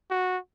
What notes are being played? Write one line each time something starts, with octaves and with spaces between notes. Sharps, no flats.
F#4